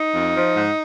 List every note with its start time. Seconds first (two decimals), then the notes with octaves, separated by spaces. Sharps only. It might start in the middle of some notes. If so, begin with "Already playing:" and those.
Already playing: D#4
0.12 F2
0.34 F3
0.55 G#2